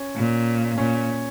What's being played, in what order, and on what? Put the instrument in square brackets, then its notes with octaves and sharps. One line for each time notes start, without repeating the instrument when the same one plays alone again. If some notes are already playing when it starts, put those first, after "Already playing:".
Already playing: [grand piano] C#4
[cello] A#2
[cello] A#2 [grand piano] C#4